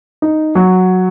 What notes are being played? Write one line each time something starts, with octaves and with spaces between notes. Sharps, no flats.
D#4
F#3